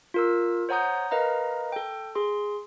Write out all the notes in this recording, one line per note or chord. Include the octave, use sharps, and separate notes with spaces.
F4 A#4 E6
C5 C#5 F#5 A#5 D#6 G6
A#4 B4 D#5 F5 A#5
A4 G5
G#4 C6